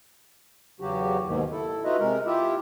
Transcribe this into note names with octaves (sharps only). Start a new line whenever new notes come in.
E2 C#3 F#3 F#4 G4
D#2 G#2 B2 D#3
E4 A4
D#4 F4 F#4 B4 D#5 E5
C3 G#3 A#4
E4 F4 G4 E5